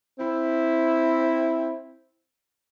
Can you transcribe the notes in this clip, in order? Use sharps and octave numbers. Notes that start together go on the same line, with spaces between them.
C4 E4